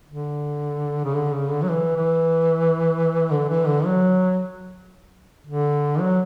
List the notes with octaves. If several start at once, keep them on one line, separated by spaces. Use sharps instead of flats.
D3
C#3
D3
C#3
D3
F#3
E3
E3
D3
E3
D3
F#3
D3
F#3